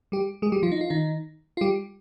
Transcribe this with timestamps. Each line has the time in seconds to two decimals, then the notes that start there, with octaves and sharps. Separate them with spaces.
0.12 G3 G4
0.42 G#3 G#4
0.52 G3 G4
0.63 F3 F4
0.72 D#4
0.81 F4
0.90 D#3 D#4
1.57 F4
1.61 G3 G4